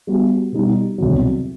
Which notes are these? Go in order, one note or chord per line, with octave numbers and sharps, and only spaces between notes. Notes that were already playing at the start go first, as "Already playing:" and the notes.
G3 B3 F#4
B2 G3 D#4
C2 B2 F#3